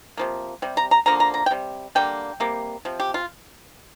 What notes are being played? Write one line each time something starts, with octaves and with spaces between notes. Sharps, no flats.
C3 F3 A#3
C3 G3
A#5
A#5
D3 F3 A#3 A#5
A#5
A#5
G5
C3 G3
D3 G3 A#3 G5
C3 G3 A#3
C3 F3
G4
F4